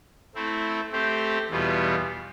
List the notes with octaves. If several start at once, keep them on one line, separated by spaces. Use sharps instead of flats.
A3 C4 E4
A3 C4 G4 C5
E2 B2 G3 B3 F4